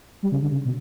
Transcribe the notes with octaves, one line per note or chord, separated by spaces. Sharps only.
G3
C#3
D3
C#3
B2